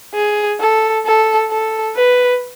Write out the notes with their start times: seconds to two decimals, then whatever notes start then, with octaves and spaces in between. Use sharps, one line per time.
0.15 G#4
0.60 A4
1.06 A4
1.51 A4
1.96 B4